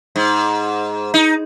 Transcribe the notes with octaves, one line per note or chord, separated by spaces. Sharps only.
G#2
D#4